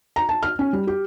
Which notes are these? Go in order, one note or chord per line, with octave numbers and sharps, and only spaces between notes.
A#5
A5
F6
C#4
G3
G4